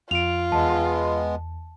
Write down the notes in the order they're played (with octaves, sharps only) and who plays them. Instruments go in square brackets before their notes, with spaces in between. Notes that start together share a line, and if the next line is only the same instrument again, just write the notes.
[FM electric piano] F2 [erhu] F4 [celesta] D7 F7
[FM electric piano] E2 [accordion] G#3 B3 [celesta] A5